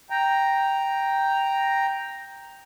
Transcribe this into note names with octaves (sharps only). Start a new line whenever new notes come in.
G5 A#5